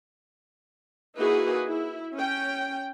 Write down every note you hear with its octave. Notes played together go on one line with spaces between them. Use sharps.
A#3 D#4 E4 F#4 G#4 B4
E4
C#4 G5